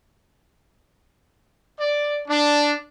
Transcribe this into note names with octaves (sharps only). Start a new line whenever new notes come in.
D5
D4